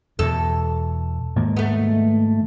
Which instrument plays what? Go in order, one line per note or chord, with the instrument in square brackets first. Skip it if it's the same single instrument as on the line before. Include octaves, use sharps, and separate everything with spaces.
[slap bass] E2 B2 [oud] A4
[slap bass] G#2 D#3 A#3
[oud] A3 B3